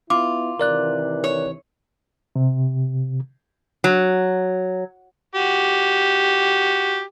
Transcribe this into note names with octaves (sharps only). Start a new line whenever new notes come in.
B3 E4 F4 D6
C3 D#3 E3 A#4 D5 F#6
C#5
C3
F#3
F#4 G4